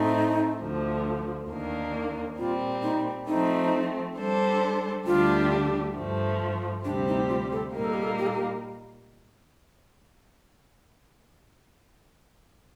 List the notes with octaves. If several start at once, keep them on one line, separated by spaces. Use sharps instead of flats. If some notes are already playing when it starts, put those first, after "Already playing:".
Already playing: A2 A3 C4 D#4
D2 D3 F3
D#2 D#3 A#3 D4
A#2 G3 C4 F4
D#4
F3 A3 C4 D#4
G3 D4 A4 C5
D2 D3 G3 D4 F4 G4
G2 F3 A3
D2 C3 G3 C4 D4 G4
D#4
F4
A4
A#2 G3 A#3 D#4 A#4
A4
G4
A4
G4
A4
G4